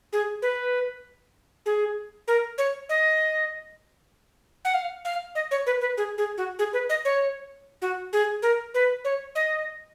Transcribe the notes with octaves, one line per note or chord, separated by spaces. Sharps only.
G#4
B4
G#4
A#4
C#5
D#5
F#5
F5
F5
D#5
C#5
B4
B4
G#4
G#4
F#4
G#4
B4
D#5
C#5
F#4
G#4
A#4
B4
C#5
D#5